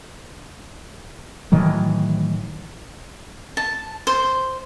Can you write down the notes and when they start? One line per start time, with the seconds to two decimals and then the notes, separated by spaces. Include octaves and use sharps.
1.52 A2 D#3 E3 F#3
3.57 A5
4.07 C5